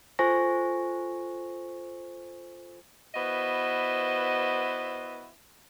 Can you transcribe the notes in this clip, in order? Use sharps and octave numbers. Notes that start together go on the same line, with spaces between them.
F4 A4 C5 G#5 C#6 A#6
B3 E4 F#4 B4 C5 D#5